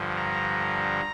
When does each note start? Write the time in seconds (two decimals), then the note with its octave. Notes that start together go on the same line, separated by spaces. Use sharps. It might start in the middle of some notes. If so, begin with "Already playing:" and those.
Already playing: G2 D3 F3
0.16 A#5